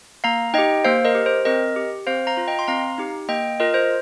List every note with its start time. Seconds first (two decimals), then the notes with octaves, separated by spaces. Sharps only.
0.24 A#3 F5 A#5
0.54 D#4 G4 D#5 G5
0.85 A#3 C5 F5
1.05 A#4 D#5
1.15 G4
1.26 C5
1.45 C4 A#4 D#5
1.76 G4
2.07 C4 C5 F5
2.27 F5 A#5
2.37 F4
2.48 D#5 G5
2.59 C6
2.68 C4 F5 A#5
2.98 D#4 G4
3.29 A#3 D#5 G5
3.60 F4 A#4 D#5
3.74 C5